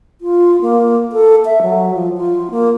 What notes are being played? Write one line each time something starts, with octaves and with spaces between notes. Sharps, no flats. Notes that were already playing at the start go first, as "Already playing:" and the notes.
F4
A#3
A4
E5
F#3
F3
F4
A#3